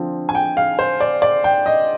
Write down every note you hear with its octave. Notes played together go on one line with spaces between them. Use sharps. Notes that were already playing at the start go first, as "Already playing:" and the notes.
Already playing: D3 F3 C4 F4
G#5
G5
F5
C5
D5
D5
G5
D#5